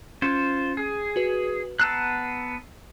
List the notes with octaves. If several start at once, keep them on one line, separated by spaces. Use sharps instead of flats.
C#4 F4 C5
G#4
F#4 B4
B3 A5 A#5 E6 F#6 C7